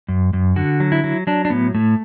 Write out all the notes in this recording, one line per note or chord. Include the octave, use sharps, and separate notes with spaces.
F#2
F#2
D3 F#4
F#3
E4
F#3
F#3 D4
D4
A2 B3
A2 A3